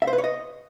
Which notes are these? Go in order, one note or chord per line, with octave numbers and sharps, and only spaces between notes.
E5
C5
B4
C#5
D#5